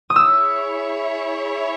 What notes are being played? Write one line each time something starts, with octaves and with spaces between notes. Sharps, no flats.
D#6
E4 G#4 C#5 E5 E6